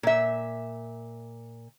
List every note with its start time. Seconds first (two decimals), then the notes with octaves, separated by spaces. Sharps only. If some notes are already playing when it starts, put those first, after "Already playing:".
0.03 A#2 E5